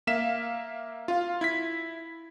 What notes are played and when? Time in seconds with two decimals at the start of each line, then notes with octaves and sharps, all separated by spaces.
0.07 A#3 E5 F5 B6 E7
1.08 F4 F5
1.41 E4 G#6 B6